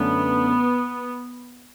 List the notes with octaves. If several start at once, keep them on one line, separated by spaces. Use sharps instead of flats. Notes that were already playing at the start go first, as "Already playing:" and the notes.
Already playing: F#2 D3 A3 B3 C#4